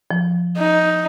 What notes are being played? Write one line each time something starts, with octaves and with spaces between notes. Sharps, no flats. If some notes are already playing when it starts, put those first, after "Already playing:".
F3
D#4